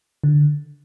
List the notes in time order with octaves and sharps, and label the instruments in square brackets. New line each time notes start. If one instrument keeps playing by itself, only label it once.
[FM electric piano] D3